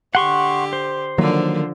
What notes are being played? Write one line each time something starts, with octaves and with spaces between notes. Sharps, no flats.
D3 G4 F#5 C6 C#6
C5
D3 D#3 F3 F#3 A#3